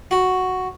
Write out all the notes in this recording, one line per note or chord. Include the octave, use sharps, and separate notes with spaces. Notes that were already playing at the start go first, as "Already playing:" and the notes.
F#4